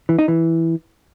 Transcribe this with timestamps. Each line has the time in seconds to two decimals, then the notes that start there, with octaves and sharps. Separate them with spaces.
0.09 E3
0.19 D#4
0.28 E3